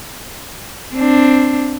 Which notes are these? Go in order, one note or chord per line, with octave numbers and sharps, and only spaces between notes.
C4 D4